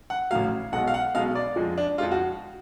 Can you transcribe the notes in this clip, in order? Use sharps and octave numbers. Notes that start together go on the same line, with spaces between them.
F#5
A1 A2 F#3 F5
B1 B2 G#3 F#5
F5
F#5
B1 B2 G#3 F5
D5
F2 F3 G#3
D4
F2 F3 G#3 F4
F#4